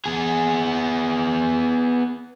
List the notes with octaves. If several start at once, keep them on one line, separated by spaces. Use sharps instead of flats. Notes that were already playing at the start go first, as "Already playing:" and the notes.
B3 G#4